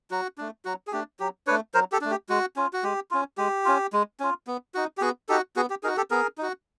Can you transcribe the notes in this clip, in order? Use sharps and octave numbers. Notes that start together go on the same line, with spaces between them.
F#3 F#4
A3 D4
F#3 F#4
G#4
A3 D4 G4
F#3 G4
A3 D4 B4 C#5
F#3 A#4 C5
G4 A4
A3 D4
G4
G#3 F#4
C#4 F4
F#4
G#3 G4
C#4 F4
G#3 G4
C#4 F4
G#3
C#4 F4
B3
D#4 F#4
G4
B3 F#4 G#4
D#4 F#4 G4 A4
B3 F#4 G#4
G4
D#4 F#4 G#4 A#4
G4 A4
B3 G#4 A#4
D#4 F#4